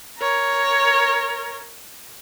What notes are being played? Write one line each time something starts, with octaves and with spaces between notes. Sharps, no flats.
A#4 C#5